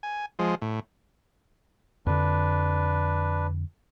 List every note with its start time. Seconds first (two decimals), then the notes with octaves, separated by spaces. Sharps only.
0.03 G#5
0.39 F3 G#3
0.62 A2
2.06 F2 D3 D4 B4